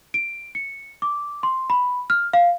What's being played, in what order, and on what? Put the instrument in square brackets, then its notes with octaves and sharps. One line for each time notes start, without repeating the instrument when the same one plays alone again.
[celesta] D7
C#7
D6
C6
B5
F6
F5